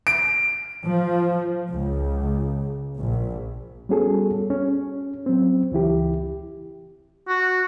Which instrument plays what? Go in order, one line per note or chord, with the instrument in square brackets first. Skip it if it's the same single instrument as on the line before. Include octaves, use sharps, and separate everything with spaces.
[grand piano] D7
[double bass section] F3
C#2
A#1
[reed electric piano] G3 B3 C#4 F#4 G#4 A4
C#4
F#3 C4
C#2 E3 E4 G4
[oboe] F#4